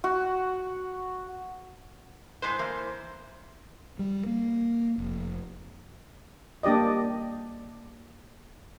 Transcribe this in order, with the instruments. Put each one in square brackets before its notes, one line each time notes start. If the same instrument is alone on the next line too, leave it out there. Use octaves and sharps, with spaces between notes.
[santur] F#4
[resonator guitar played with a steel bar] A2 G#3 B4 [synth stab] C5
[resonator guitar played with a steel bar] E3 A#3
[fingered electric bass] G3
A#3
F1
[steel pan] A#3 D4 G4 D5 D#5